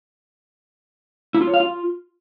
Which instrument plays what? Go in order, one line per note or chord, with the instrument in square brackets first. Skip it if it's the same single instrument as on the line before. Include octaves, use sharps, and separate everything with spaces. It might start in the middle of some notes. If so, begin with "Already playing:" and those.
[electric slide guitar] E4
F4
C#5
F5
F4